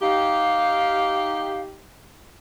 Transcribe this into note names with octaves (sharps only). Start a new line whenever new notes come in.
D#4 G4 F5